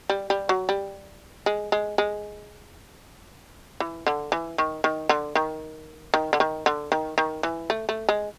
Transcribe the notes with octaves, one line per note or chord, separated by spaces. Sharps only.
G3
G3
F#3
G3
G#3
G#3
G#3
E3
D3
E3
D#3
D#3
D3
D#3
D#3
D3
D#3
D3
D#3
D#3
E3
A3
A3
G#3